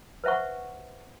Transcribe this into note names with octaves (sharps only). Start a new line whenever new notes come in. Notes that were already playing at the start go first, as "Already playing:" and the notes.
B4 C5 E5 F#5 C#6